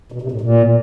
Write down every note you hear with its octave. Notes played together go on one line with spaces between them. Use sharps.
B2
C3
A2
A#2